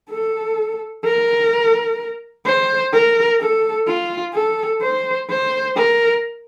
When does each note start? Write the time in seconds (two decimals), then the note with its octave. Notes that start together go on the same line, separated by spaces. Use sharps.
0.10 A4
1.05 A#4
2.45 C5
2.92 A#4
3.41 A4
3.87 F4
4.34 A4
4.81 C5
5.29 C5
5.76 A#4